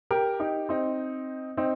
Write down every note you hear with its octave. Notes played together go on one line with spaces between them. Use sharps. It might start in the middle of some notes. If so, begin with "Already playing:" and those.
G4 A#4
D#4 G4
C4 D#4
C4 D#4